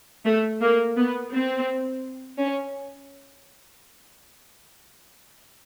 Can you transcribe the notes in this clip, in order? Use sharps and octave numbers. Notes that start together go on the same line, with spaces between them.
A3
A#3
B3
C4
C#4